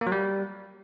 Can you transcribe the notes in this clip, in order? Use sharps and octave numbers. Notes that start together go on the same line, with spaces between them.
A#3
F#3
G3